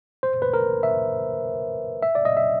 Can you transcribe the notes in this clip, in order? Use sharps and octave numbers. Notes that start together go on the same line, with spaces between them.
C5
B4
A#4
E5
E5
D5
D#5
E5